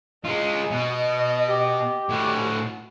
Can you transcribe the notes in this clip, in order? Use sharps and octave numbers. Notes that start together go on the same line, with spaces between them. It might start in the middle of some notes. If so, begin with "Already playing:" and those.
G#3 F4 D#5
B2
G4
A2 F#4